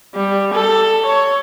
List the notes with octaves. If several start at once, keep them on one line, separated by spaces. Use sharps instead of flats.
G3
A4
C#5